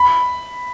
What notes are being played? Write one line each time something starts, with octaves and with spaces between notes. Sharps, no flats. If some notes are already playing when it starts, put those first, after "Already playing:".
Already playing: B5